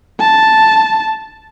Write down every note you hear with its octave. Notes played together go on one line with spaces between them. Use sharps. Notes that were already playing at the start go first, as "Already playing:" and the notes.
A5